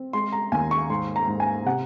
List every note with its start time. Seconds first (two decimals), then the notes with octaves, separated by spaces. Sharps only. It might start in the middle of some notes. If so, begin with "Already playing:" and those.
Already playing: C4
0.13 G#3 C6
0.32 A#5
0.52 D#2 G#5
0.71 C#6
0.89 G#2 C6
1.16 A#5
1.27 G#2
1.40 G#5
1.66 C3 F#5